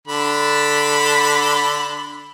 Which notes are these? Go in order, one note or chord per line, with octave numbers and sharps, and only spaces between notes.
D3 A4 B5